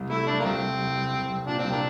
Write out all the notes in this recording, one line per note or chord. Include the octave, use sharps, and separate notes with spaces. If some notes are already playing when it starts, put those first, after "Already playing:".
Already playing: C2
A3 E4
A3 D4
A#3
C2 F3 C4
C2
C2
C2
C2
C2
A#2 D4
C2 C4
A#3 D4